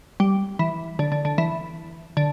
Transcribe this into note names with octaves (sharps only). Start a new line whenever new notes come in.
G3
E3
D3
D3
D3
E3
D3